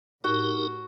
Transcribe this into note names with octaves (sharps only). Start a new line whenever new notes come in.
A2 D#4 F#4 G4 A#4